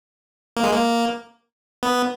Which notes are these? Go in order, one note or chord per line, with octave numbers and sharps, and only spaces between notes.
A#3
G#3
A#3
B3